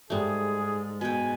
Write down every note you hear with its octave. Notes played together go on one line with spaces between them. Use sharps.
G#2 G3 A3 G#4
B2 G5 G#5